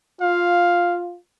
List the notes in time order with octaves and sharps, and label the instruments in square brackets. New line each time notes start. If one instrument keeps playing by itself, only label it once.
[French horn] F4 [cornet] F5